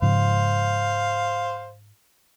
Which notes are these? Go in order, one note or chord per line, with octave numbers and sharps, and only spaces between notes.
G#2 C#3 F3 C5 F5